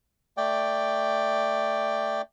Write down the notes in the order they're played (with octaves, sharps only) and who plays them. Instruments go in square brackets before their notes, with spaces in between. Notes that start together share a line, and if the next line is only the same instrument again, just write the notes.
[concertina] A3 D5 G5